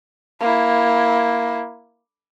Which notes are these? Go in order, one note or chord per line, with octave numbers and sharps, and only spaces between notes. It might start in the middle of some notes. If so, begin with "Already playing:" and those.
A#3 E4